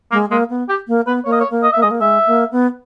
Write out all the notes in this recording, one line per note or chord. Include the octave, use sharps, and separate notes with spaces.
G#3 A#3
G#3 A#3
B3
G4
A#3
B3 B4
A#3 C#5
D#5
C#5
A#3
D#5
A#3 E5
G#3 D#5
A#3
G#3 E5
A#3
B3